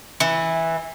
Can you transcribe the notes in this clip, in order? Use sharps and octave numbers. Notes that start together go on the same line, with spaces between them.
E3